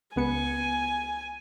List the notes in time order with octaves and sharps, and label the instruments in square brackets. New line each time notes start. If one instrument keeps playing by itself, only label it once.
[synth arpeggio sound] C#2 B3 C#7 [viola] G#5